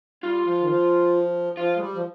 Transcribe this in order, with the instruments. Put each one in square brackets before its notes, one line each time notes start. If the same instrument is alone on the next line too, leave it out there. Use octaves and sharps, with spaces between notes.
[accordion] G3 [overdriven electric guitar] F4
[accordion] F3
D#3
F3
[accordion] F3 [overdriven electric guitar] F4
[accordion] G#3
G3
F3